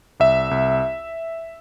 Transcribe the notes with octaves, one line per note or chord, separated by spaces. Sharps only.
C2 E5
C2